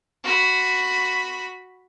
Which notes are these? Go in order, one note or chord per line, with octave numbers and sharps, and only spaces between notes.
F#4 B5